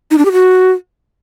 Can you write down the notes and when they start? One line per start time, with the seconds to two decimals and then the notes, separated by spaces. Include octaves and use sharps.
0.11 D#4
0.18 D4
0.25 G4
0.32 F#4